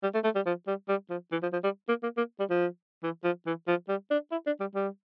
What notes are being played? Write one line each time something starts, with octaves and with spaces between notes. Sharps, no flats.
G3
A3
A3
G3
F3
G3
G3
F3
E3
F3
F3
G3
A#3
A#3
A#3
G3
F3
E3
F3
E3
F3
G3
D4
E4
D4
G3
G3